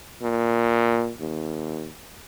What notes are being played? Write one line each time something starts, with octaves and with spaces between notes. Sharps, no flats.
A#2
D#2